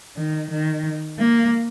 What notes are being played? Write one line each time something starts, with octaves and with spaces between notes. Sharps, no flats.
D#3
D#3
A#3